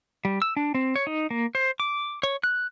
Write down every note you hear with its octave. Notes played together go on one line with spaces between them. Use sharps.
G3
E6
D4
C4
C#5
D#4
A#3
C5
D6
C#5
F#6